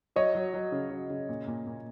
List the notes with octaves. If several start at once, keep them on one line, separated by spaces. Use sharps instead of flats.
F#3 C#5 D#5
F#3
F#3
C#3
F#3
C#3
A#2
A#2
A#2